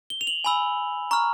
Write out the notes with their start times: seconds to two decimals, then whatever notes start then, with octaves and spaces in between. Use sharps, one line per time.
0.10 G7
0.21 F7
0.27 F#7
0.44 G#5 B5 E6
1.11 A#5 C#6 F6